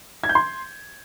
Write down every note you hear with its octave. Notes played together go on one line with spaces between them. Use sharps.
G#6
G6
C6